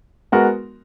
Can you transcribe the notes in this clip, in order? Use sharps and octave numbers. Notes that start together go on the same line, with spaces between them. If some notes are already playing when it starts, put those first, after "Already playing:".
G#3 B3 F#4 A#4